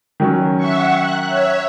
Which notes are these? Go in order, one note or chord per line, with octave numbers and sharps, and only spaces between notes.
D#3 F#3 C#4
E5 F#5 C#6
F#6
C#5 E5